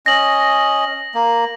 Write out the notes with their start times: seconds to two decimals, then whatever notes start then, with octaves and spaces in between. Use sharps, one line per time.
0.06 C#4 D#5 A#6 F#7
1.15 A#3